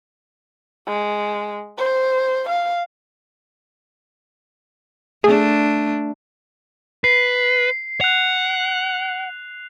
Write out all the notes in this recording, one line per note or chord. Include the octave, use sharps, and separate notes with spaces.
G#3
C5
F5
A3 D4 G#4
B4 C7
F#5 F#6 F7